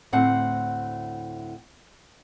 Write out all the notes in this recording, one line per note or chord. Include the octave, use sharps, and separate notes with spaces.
D2 A2 C4 F#5